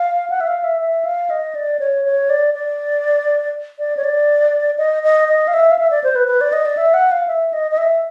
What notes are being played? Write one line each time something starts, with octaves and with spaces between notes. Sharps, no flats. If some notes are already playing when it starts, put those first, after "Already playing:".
Already playing: F5
F#5
E5
F5
E5
E5
F5
D#5
D5
C#5
C#5
D5
D5
D5
C#5
D5
D#5
D#5
D#5
F5
E5
F5
E5
D5
C5
B4
B4
D5
D#5
D5
E5
F#5
F5
E5
D#5
D#5
E5